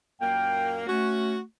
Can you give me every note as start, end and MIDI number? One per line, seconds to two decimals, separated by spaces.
0.21 0.84 42
0.21 0.84 46
0.21 0.84 58
0.21 0.77 79
0.87 1.43 57
0.87 1.37 61
0.87 1.37 66